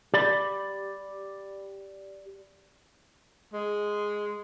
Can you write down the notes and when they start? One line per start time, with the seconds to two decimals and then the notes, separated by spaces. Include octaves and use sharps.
0.14 G4 D5 B5
3.53 G#3